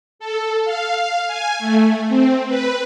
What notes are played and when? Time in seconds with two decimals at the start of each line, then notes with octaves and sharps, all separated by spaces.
0.19 A4
0.65 F5
1.27 G#5
1.59 A3
2.09 C4
2.48 B4